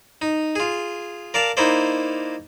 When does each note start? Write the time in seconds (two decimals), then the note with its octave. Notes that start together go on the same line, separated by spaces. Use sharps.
0.22 D#4
0.56 F4 G#4
1.34 A#4 D5 F5 A5
1.57 A#3 D#4 E4 C5 D5